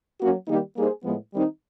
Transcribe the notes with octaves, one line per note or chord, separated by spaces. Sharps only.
F#3 A#3 C#4 F#4
D#3 G3 A#3 D#4 G4
G3 A#3 D#4 G#4 C5
A2 F3 G#3 B3
D#3 G3 C4 D#4